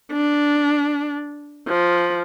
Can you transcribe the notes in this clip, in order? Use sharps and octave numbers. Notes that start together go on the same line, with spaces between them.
D4
F3